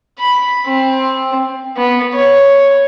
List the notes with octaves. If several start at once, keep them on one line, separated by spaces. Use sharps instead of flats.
B5
C4
B3
C#5